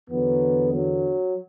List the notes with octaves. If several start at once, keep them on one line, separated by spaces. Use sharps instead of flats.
E2 D3 F#3 B3
F#3